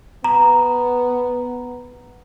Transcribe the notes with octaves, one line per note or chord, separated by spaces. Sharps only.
B3 A#5